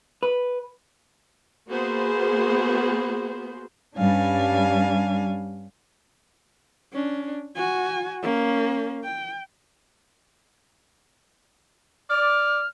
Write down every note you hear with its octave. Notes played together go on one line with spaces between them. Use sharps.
B4
A#3 B3 F#4 G#4 C5
G2 G3 C#4 D4 F5 G#5
C#4 D4
F#4 G#5
A#3 C#4
G5
D5 F6